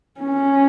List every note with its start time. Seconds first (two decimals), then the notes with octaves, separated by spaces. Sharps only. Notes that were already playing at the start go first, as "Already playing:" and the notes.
0.20 C#4